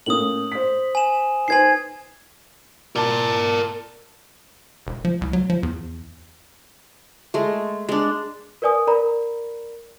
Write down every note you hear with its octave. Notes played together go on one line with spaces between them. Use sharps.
A2 A#3 C#4 D#6 F#7
C5 B6
G#5 E7
D#4 B4 C5 G#5 G#6 C7
A#4 D5 A5
E1
F3
C2
F#3
F3
E2
G#3 A3
G#3 D4
A#4 B4 D5 G#5 D#6
A#4 D5 A#5 B5